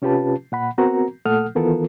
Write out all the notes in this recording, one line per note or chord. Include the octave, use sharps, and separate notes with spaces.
C3 C#4 F4 G4 B4 A5
A#2 F#5 B5
B3 C4 F#4 A#4 A#5
A#2 A3 A4 F#5 D#6 F6
D#3 E3 B3 F4 A4 A#4